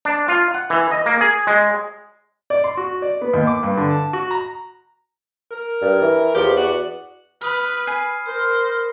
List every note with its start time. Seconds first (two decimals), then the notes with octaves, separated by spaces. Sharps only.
0.05 D4
0.28 F4
0.54 F#5
0.70 E3
0.91 D#5
1.06 A#3
1.21 G#4
1.47 G#3
2.50 D5
2.64 C6
2.77 F#4
3.02 D5
3.21 B3
3.33 D#2
3.47 D6
3.63 G2
3.77 D3
3.90 A5
4.13 F#4
4.31 A#5
5.51 A#4
5.81 G2
6.02 E3
6.35 E2 F3 G4
6.56 B3 F#4 D5
7.42 B4 B5 D#6 F6
7.87 G#5 C7
8.27 A#4 C5